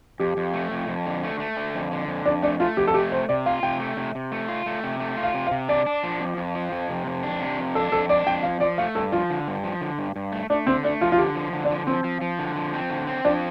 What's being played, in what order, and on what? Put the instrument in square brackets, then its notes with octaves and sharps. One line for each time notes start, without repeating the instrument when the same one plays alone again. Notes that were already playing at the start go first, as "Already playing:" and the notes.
[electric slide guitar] F2 [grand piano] G4
[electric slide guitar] F2
A3
F2
F2
D3
A3
A3
D3
F2
D3
F2
[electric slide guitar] F2 [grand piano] D4
[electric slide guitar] A3 [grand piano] D4
[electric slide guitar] A3 [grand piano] F4
[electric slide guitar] F2 [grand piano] G4
[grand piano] A4
[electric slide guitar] A3 [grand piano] G4
[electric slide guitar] C3 [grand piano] C5
[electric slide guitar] C3 [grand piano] D5
[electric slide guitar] F4 [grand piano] F5
[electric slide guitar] C3 [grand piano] G5
[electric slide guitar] A3
C3
C3
A3
F4
A3
C3
A3
F4
[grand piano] F5
[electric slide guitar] C3
[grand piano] F5
[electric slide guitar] C3
[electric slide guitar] D4 [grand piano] D5
[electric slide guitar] D4
F3
F2
F2
F3
F2
C3
F2
D4
C3
F2
[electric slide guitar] D4 [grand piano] A4
[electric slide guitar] F2 [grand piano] A4
[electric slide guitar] D4 [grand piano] D5
[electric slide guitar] F2 [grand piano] G5
[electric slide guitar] F3 [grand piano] F5
[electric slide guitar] F3 [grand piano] D5
[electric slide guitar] A3 [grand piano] F5
[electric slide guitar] G2 [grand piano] A4
[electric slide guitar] F3 [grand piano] F4
[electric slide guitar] D3
G2
F3
D3
G2
G2
A3
[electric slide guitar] A3 [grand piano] D4
[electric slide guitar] D3 [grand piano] C4
[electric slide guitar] A3 [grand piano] D4
[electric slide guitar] F3 [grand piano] F4
[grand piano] F4
[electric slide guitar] D3 [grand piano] G4
[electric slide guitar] F3
D3
[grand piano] D4
[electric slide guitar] F3
[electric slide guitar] F3 [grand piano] C4
[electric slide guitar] F3
F3
D3
F3
C4
D3
C4
[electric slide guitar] F3 [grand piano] D4